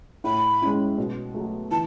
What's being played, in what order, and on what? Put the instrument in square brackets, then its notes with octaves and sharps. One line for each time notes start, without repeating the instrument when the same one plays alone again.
[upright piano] A2 [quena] B5
[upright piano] G#3 C#4 E4
B2
F#3 A3
[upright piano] E3 [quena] A5